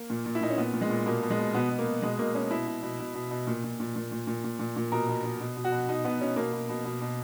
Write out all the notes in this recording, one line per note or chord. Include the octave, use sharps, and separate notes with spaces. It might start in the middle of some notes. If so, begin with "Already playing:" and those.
Already playing: A#3
A#2
A#2
E4
A#2 D#4
C#4
A#2 B3
A#2
G#3
A#2
B2 A#3
B2
G#3
B2
B2 B3
B2
A#3
B2
B2 G#3
B2 A#3
B2 C#4
B2 E4
B2
B2
B2
B2
B2
A#2
A#2
A#2
A#2
A#2
A#2
A#2
A#2
A#2
B2 A#4
B2
B2
B2
B2
F#4
B2
B2 D#4
B2 B3
B2 C#4
B2 A#3
B2
B2
B2
B2